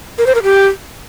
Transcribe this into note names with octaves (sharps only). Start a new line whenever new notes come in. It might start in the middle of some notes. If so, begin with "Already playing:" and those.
A#4
C5
A#4
G4